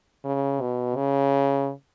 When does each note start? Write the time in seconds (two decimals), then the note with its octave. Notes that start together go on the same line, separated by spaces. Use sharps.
0.25 C#3
0.61 B2
0.96 C#3